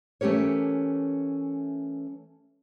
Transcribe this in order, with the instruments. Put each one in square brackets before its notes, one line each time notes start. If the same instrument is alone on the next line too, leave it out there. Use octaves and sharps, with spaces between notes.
[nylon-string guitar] E3 A3 C#4 G4 A#4 C#5